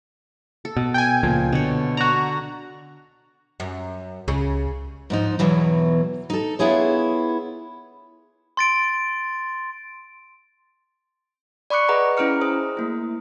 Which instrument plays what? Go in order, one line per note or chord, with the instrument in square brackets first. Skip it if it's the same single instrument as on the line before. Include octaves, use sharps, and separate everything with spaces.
[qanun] A4
[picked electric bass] B2
[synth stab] G5 G#5
[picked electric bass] C#2 A#2 F3
[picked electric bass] B2 [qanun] D3 C#5
[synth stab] F#4 A#5 [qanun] D5
[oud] F#2
[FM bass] C#2 [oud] C#3
[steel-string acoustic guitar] G#2 F3 D#4
E2 B2 E3 F#3
D#4 A4
B3 E4 F4 G#4 C#5
[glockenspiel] C6 A6 D7
[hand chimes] D5 B5 C#6 D6 F#6 C#7
G#4 B4 D#5 F#5 A#5
C#4 E4 G#4 A#5 F6 C#7
G#4 C5 D#6
A3 A#3 E4